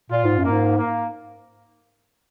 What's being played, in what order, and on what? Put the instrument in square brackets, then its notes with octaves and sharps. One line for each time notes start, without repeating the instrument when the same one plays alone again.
[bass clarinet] A#2 [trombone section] F4
[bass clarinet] G#2
F#2
[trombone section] A#3
[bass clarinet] G#2
[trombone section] A#3